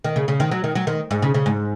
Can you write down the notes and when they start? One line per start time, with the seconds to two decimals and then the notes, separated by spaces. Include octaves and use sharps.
0.04 D#3
0.16 C#3
0.28 C#3
0.40 D#3
0.51 F#3
0.64 D#3
0.75 F#3
0.87 D#3
1.11 G#2
1.22 C#3
1.34 C#3
1.46 G#2